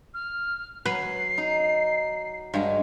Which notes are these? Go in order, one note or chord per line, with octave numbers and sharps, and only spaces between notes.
F6
F#3 B4 C7
D#4
G2 F#3 G#3